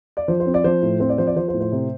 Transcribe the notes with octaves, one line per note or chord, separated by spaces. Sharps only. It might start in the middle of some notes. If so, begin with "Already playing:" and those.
D5
F3 C5
C5
C4
D5
F3 C5
A2
C4 C5
D5
F3 C5
D5
F3 C5
C5
A2
C5
C3